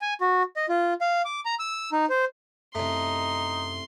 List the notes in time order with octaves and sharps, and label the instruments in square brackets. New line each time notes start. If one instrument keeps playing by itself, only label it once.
[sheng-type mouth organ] G#5
F#4
D#5
F4
F5
D6
A#5
E6
D#4
C5
[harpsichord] C2 A3 [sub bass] F#2 [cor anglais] D#4 [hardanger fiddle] C6